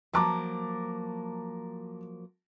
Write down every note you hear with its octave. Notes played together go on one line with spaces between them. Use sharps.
F3 F#3 A#3 A5 A#5 D6